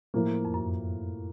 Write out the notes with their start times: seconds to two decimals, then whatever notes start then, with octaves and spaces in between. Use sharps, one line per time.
0.14 A2 F3 A#3
0.45 F2
0.54 F#2